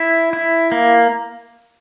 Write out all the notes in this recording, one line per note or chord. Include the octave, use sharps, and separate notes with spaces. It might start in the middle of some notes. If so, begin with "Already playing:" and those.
Already playing: E4
E4
A#3